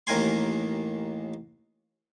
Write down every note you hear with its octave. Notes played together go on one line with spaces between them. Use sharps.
A1 D#2 D#3 A#4 G#5 C6